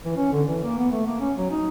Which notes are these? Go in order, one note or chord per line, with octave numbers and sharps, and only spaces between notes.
E3
C#4
D3
E3
A#3
B3
A3
A#3
C#4
F#3
D#4